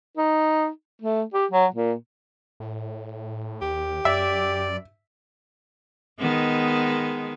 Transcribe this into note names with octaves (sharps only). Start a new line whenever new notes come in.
D#4
A3
G4
F#3
A#2
A2
D#2 G4
F#2 D5 E5
D#3 G#3 B3